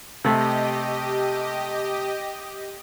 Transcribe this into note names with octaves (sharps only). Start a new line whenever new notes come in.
C3 A3 G4 D#5